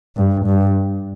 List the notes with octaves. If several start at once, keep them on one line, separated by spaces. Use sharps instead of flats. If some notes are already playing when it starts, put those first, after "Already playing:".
G2
G2